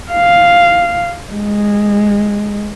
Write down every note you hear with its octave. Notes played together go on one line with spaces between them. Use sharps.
F5
G#3